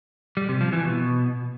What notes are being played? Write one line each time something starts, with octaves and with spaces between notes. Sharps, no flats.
G3
C3
F3
E3
B2